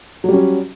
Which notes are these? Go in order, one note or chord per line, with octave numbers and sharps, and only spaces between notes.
F#3 G3 C#4